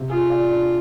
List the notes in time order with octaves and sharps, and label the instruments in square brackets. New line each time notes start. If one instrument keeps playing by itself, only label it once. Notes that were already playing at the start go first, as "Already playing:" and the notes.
Already playing: [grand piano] C3
[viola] F4 [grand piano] G#4
[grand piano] D5
D4